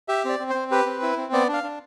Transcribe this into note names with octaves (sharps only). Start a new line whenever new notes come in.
G4 E5
C4 D5
C4
C4 C5
G4 B4
C4
E4
C4
B3 D5
D4 F5
D4